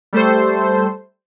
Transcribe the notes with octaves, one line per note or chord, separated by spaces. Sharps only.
G3 A3 A4 C5